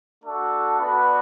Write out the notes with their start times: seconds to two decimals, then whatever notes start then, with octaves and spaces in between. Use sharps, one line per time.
0.24 A3 D4 F#4 A4
0.79 B3 D4 F#4 B4